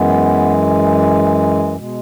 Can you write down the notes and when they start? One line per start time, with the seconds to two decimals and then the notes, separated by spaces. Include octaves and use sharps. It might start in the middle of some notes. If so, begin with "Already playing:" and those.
Already playing: F#2 E3 G#3 B3
1.75 B2 G#3